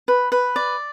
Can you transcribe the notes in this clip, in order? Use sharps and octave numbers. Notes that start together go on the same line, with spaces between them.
B4
B4
D5